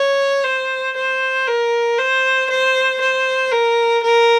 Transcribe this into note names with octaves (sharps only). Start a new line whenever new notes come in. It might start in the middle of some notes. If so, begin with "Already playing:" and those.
Already playing: C#5
C5
C5
A#4
C5
C5
C5
A#4
A#4